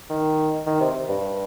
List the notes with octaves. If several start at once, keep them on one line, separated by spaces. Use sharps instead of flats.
D#3
D#3
C3
G2